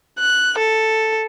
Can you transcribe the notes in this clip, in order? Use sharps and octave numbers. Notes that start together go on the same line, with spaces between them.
F#6
A4